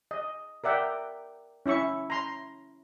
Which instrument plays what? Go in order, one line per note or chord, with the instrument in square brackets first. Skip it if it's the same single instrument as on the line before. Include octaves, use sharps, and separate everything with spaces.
[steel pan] D#5
A#4 D5 E5 F#5 G5
C#4 E4 E5 C#6
A#5 C6